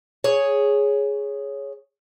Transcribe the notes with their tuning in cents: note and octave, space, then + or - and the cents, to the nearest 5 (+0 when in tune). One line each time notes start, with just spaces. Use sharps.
G#4 +0 C#5 +0